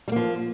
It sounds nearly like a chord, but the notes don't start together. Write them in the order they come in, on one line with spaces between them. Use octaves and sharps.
G3 A#3 F3